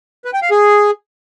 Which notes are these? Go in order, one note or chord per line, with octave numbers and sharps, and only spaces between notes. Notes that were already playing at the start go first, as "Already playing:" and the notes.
B4
G5
F5
G#4